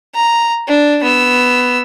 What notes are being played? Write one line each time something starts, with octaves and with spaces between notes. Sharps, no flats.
A#5
D4
B3 E6